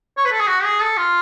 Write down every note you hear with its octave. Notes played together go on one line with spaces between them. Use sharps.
C#5
B4
A4
G#4
F#4
G#4
A4
F4